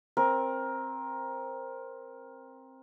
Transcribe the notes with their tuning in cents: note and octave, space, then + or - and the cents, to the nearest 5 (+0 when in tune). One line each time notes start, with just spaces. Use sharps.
C4 +15 A#4 +15